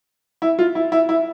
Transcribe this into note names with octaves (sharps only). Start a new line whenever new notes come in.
E4
F4
E4
E4
E4